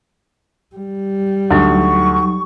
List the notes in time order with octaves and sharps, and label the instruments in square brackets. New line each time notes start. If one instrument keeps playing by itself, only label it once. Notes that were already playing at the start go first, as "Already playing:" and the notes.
[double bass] G3
[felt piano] D2 [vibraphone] F#3 D#4 [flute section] C#6